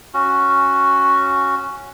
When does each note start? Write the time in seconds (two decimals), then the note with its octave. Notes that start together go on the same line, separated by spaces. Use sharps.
0.14 C#4 F#4